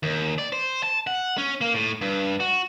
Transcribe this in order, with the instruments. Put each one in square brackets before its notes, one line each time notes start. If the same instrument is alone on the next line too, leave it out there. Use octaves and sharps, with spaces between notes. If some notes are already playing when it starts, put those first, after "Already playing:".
[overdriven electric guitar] D#2
D5
C5
A5
F#5
C#4
A#3
A2
G2
F#4